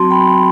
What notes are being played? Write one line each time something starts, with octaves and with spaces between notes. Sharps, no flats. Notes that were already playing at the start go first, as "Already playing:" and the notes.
Already playing: F#3 C4 F#4 A5 C6
G5 B5